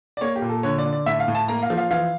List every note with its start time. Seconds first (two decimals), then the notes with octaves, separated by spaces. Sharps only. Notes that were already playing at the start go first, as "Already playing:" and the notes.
0.17 D5
0.21 A#3 C#5
0.36 G4
0.42 A#2
0.49 A4
0.63 D3 C#5
0.78 D5
0.86 D3
0.93 D5
1.06 A2 E5
1.20 F5
1.28 A2
1.35 A5
1.48 A#3 A#5
1.63 F5
1.70 F3
1.78 F5
1.91 E3 F5